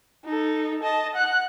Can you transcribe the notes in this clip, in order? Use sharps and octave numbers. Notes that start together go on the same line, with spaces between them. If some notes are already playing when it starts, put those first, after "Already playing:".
D#4 A4
D#5 A5
F#5 F#6